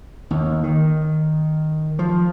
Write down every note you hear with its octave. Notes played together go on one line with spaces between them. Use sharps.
D#2
D#3
F3